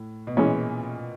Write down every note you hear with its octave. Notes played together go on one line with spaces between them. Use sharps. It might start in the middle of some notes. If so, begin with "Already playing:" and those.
Already playing: A2
B2
A#2 E3 G#3 C#4